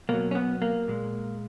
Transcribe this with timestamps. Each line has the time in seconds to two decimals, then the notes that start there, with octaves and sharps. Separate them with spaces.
0.09 B2 F#3 A#3
0.31 C#4
0.35 B3
0.62 A#3
0.88 A#2 G#3